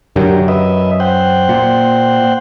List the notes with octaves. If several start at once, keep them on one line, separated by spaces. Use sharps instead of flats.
F#2 D3 G4 A#4
B4 D#5 E5
C5 F#5 G5
A#2